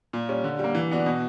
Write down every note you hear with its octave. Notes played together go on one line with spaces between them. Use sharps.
A#2
G3 C#4
D3
G3 A#3
E3
B3 D4 F#4
B2